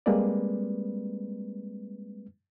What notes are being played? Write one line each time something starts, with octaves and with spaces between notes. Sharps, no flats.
G3 G#3 A#3 C4 B4 D5